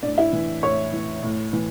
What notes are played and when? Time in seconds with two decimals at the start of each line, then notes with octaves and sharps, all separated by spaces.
0.03 A2 D4 D5
0.18 E4 E5
0.33 E3
0.63 A2 C#5 C#6
0.93 E3
1.23 A2
1.53 E3